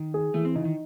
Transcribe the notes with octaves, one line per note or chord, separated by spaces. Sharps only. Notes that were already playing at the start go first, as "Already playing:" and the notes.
Already playing: D#3
G#4
E3 A3
C4
C#3 D#4
D#3